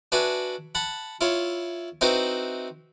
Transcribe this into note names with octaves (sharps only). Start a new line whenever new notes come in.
D4 F#4 B4 E5 G#5
F#5 A5 B5
E4 F4 C#5
C4 D#4 E4 F#4 B4 C5